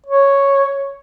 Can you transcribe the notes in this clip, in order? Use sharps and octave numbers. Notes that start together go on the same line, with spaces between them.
C#5